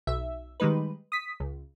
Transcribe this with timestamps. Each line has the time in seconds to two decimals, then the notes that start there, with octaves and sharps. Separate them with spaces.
0.07 B1 E5
0.60 D#3 G3 G#3 D#4 B4
1.12 D#6 B6
1.40 C#2